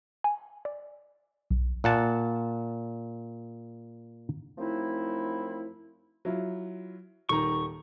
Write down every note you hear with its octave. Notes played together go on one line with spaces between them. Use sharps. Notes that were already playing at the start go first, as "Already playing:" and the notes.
G#5
D5
B1
A#2 F#5 A5
F#2 F3 A3 C4 D#4 E4
F#3 E4 F4
D#1 D#3 A#5 C#6